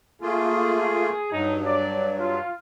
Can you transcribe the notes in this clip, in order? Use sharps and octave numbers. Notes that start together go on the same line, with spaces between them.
A3 A#3 F4 G#4
G2 F#3 D#4
D5
F4